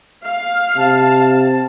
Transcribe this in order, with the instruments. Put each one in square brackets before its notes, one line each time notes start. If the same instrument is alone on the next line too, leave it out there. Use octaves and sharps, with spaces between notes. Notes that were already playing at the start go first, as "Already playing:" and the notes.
[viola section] F5
[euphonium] C3 [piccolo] A5